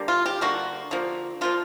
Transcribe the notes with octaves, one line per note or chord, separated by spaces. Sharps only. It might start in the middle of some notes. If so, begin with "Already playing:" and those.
Already playing: D3 G3 A#3
F4
G4
D3 G3 A#3 F#4
D3 F3 A#3
D3 F3 A#3 F4